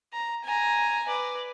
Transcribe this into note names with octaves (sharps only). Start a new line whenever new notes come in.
A#5
G#5 A#5
B4 D5